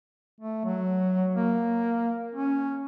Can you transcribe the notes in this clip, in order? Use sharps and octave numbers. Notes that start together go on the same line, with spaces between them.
A3
F#3
A#3
C#4